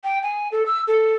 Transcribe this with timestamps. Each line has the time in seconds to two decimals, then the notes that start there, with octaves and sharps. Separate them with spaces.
0.04 G5
0.23 G#5
0.52 A4
0.66 E6
0.87 A4